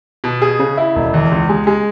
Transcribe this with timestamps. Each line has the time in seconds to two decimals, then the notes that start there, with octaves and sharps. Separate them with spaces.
0.24 B2
0.42 G#4
0.59 C#3
0.77 E4
0.95 E1
1.14 E2
1.31 C#2
1.49 G#3
1.67 G#3